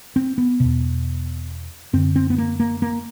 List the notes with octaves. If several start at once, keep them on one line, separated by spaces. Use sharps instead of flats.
C4
B3
E2 B2
F#2 D3 C4
C4
B3
A#3
A#3
A#3